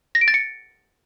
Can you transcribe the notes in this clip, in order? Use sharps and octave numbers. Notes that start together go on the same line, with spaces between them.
A#6
D7
A6
C#7